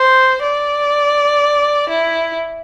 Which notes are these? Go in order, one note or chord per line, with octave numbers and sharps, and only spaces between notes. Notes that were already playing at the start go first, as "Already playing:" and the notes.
Already playing: C5
D5
E4